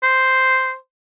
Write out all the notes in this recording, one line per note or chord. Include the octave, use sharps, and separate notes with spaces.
C5